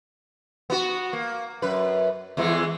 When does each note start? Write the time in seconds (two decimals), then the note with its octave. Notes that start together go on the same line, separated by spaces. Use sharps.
0.70 B3 F#4
1.13 A#3
1.62 F#2 B4
2.37 E2 E3 G#3